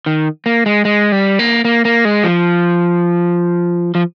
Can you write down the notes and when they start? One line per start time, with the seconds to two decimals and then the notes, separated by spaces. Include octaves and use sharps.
0.06 D#3
0.46 A#3
0.66 G#3
0.85 G#3
1.12 G3
1.39 A#3
1.65 A#3
1.85 A#3
2.05 G#3
2.24 F3
3.95 F3